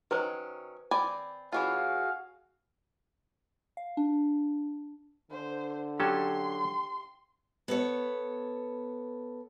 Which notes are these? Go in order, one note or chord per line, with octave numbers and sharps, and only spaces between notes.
D#3 F#3 C#4 B4 C5
C4 D5 G#5 B5
E3 C#4 F4 F#4 G#4 F5
F5
D4
D3 C5
F#3 C#4 G4 A4 C6
B3 A4 C#5